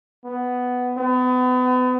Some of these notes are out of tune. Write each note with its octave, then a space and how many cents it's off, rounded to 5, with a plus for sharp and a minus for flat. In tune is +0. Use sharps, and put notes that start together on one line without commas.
B3 +10
B3 +35